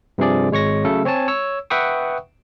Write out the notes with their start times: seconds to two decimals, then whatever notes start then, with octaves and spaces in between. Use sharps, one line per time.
0.18 G2 C3 F3 G#4 D5
0.51 G#1 G#3 C#5 C#6 A#6
0.84 C#3 F#3 A3 A4
1.05 C4 C#5 G#5 A5
1.28 C#5 E6
1.70 B4 E5 F#5 G5 C#6 D#6